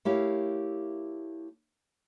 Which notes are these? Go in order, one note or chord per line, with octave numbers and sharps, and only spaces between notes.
A3 E4 G4 A#4 C#5 F5